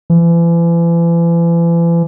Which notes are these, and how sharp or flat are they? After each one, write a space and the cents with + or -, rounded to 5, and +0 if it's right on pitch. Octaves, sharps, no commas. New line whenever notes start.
E3 +40